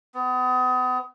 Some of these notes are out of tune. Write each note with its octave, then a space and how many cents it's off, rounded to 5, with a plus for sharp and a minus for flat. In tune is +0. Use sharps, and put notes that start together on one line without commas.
B3 +35